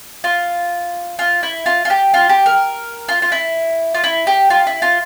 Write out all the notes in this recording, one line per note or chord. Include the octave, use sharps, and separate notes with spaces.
F4
F4
E4
F4
F4
G4
F4
G4
A#4
F4
F4
E4
F4
E4
G4
F4
E4
F4